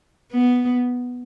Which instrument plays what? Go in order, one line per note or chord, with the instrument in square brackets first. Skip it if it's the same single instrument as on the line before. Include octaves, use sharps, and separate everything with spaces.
[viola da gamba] B3